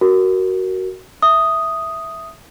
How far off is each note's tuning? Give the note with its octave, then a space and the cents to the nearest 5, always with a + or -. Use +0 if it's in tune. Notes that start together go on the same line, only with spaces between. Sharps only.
F#4 +15 A#4 +0
E5 +0 D#6 +0